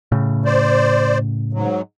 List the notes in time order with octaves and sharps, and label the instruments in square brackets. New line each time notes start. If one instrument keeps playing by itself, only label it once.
[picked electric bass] A2 C#3
[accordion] C5 D5
G#2 F#3